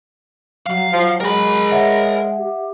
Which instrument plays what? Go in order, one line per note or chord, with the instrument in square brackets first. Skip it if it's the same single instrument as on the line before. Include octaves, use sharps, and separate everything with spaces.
[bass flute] F#3 [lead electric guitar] F5
[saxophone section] F3 [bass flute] F#3
[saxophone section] G#3 [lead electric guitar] A#4 B5
[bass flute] C#5 [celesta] E5 F#5
[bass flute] G4